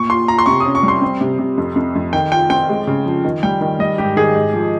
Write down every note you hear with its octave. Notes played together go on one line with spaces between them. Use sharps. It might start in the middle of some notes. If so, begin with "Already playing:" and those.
Already playing: A#2 C#6
F4 C6
F4 A#5
C6
C3 C#6
D#6
C#4
C#6
G3
C6
C4
C3
C3
F2
F2
F2
D#3 G5
F4 G5
C4 G5
G#3
C#3
F3
D#3
G3 G5
D#3
G3 D#5
G#2 G4
D#3 G#4
G#2
F3